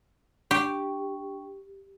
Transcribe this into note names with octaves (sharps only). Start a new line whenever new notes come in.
D4 G4 G5 C#6